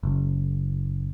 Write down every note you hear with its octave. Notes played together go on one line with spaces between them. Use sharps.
F#1